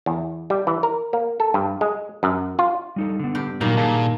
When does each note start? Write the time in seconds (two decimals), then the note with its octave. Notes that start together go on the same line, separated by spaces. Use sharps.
0.06 E2
0.50 G3
0.67 E3
0.83 A#4
1.13 A#3
1.40 A4
1.54 G2
1.81 G#3
2.23 F#2
2.59 F4
2.96 G3 D#4 A4
3.19 D3 B3
3.35 G2 G4
3.61 A#2 D#3 F#3 G3 A#3
3.77 A#2 G#4 F5 A5